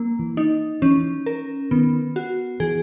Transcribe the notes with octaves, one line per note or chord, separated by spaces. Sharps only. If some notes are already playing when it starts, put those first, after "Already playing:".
Already playing: A#3
E3
D#4
E3 C#4
A#4
D#3 B3
F#4
E3 G#4